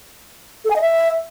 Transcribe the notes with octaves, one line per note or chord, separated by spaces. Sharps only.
A4
G#5
D#5
E5